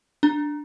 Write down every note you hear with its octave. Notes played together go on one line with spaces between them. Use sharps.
D4